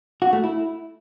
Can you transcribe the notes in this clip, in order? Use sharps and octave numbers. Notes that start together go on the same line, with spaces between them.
F#4
A3
E4